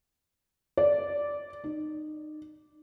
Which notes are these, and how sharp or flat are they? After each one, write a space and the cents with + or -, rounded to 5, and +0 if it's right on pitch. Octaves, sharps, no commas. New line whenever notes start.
D5 -10
D#4 -25